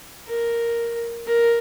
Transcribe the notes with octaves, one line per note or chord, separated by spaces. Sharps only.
A#4
A#4